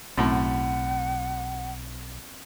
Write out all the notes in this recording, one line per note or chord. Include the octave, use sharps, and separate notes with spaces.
B1 F#2 A2 C4 F#5